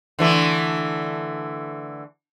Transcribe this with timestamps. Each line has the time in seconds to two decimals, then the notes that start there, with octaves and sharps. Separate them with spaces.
0.19 D3 E3 A3